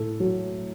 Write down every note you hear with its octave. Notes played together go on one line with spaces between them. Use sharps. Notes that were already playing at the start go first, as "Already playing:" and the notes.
Already playing: A2 A4
F#3